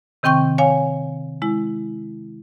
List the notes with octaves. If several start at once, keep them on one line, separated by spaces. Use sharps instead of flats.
C3 D#3 C4 G5 C#6 G6
C#5 F5 G#5
G#3 E4